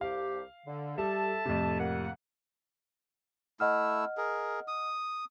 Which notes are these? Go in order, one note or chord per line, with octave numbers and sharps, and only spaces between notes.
C2 G4 F5
D3
G3 A4 E5 A5
F2 A2 C3
A#3 F#5
A3 E4 D#5 F#5 E6 F6
G#4 A#4
D#6